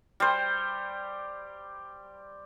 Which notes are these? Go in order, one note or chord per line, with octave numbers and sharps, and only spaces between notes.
G3 C5